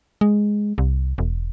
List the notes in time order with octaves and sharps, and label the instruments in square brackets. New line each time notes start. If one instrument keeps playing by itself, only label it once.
[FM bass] G#3
C2
E1